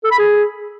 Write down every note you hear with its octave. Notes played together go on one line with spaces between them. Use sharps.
A4
B5
G#4